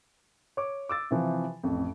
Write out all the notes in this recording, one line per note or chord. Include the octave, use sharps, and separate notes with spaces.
C#5 D6
D6 E6 A6
C3 E3 F3
A1 F2